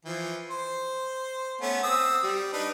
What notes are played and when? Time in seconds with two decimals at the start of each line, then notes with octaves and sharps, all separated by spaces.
0.05 E3 F3
0.50 C5
1.61 A3 B3 C#4
1.83 C4 D#6 E6
2.23 G3
2.53 D4 D#4 B4